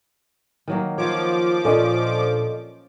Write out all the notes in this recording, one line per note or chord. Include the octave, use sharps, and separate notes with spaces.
D#3 F#3 A#3
F3 F4 C#5 D6
A#2 C#4 D4 A4 D5 D#5